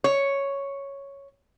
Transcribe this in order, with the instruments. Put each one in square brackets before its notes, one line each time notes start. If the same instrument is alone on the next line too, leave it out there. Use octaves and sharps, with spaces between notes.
[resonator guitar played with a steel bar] C#5